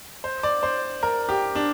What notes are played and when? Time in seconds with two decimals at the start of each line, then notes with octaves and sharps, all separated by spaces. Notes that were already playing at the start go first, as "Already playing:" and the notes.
0.24 C5
0.43 D5
0.63 C5
1.03 A#4
1.29 G4
1.55 D4